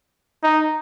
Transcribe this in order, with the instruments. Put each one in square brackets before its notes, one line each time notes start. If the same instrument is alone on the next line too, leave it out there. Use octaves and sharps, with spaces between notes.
[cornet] D#4